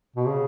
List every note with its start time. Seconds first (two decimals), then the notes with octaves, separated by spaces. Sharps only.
0.16 B2
0.28 C#3